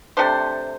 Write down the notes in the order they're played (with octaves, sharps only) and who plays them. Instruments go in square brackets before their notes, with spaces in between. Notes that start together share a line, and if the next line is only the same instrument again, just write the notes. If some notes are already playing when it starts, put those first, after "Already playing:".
[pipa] C3 A3 D4 C5